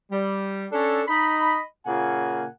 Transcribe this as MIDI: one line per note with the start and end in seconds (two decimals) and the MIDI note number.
0.12 0.66 55
0.72 1.02 61
0.72 1.02 62
0.72 1.02 69
1.08 1.58 63
1.08 1.58 75
1.08 1.58 83
1.86 2.46 46
1.86 2.46 49
1.86 2.46 58
1.86 2.46 78
1.86 2.46 80